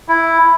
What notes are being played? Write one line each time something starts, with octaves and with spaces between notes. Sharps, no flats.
E4